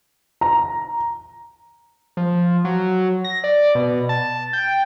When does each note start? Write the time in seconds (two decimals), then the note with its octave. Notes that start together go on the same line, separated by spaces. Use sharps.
0.41 A#5
2.17 F3
2.65 F#3
3.25 A#6
3.44 D5
3.75 B2
4.09 A5
4.53 G5